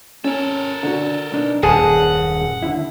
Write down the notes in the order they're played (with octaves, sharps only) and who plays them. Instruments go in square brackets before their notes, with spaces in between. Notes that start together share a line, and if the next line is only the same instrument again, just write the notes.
[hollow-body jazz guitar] C#4 [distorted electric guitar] A4 A#4
[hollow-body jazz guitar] D3 F#4
B1 D4 D#4
[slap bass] D#1 F#2 [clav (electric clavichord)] G#4 A5 [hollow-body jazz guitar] A4 B4 G#5 [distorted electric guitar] F#5
[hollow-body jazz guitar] D#2 D3 E4